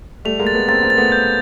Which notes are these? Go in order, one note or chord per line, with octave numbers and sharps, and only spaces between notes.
G3 A3 F7
G#3 A#3
A6
A3 B3
A#3 C4 A6
A#3 C4
A6
A3 B3
G6